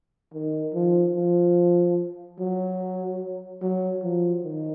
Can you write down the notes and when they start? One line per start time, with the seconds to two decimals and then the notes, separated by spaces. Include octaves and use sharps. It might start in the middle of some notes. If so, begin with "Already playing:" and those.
0.34 D#3
0.74 F3
1.16 F3
2.39 F#3
3.62 F#3
4.03 F3
4.44 D#3